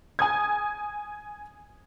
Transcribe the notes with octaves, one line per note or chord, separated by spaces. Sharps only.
G#5 D#6 G#6